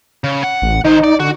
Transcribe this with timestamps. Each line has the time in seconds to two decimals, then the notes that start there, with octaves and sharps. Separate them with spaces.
0.24 C#3
0.44 F#5
0.62 A1
0.85 D#3 D#4 C5
1.04 D5
1.20 D3 F#4